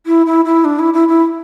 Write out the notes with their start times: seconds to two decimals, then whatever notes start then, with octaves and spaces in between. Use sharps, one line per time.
0.06 E4
0.26 E4
0.45 E4
0.65 D4
0.79 E4
0.94 E4
1.08 E4